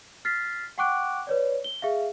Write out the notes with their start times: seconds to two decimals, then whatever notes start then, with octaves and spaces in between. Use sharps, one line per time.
0.25 F6 A6 B6 C7
0.78 F#5 G5 C#6 D6 F#6 D7
1.27 B4 C#5 D5
1.64 G7
1.82 G#4 E5 F5